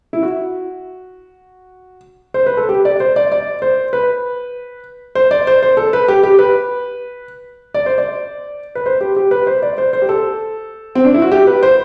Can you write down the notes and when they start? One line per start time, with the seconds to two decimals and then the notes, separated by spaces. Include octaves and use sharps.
0.13 E4
0.23 F#4
2.34 C5
2.46 B4
2.57 A4
2.69 G4
2.85 D5
3.00 C5
3.16 D5
3.32 D5
3.62 C5
3.93 B4
5.15 C5
5.31 D5
5.47 C5
5.62 C5
5.77 A4
5.93 B4
6.08 G4
6.23 G4
6.39 B4
7.74 D5
7.86 C5
7.98 D5
8.75 B4
8.86 C5
9.01 G4
9.16 G4
9.31 B4
9.47 C5
9.62 D5
9.78 C5
9.93 C5
10.02 G4
10.09 A4
10.95 C4
11.05 D4
11.14 E4
11.22 F#4
11.32 G4
11.47 B4
11.63 C5